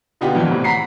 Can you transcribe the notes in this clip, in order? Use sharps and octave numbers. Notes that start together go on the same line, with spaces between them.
B2 D3 B3 D#4 F4 G4
F2 A#2 D#3 E3
A2 C3
F#5 A#5 B5 B6 C7